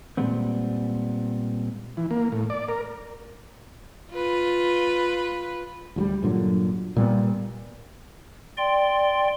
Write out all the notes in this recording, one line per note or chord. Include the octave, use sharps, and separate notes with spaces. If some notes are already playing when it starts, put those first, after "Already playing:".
A#2 F3 G3 G#3 B3 C4
E3
A#3
A2
D5
A#4
F4 B4
D2 F3 G3
G1 A#2 D3 F#3
A#2 G3 B3
D5 G5 C6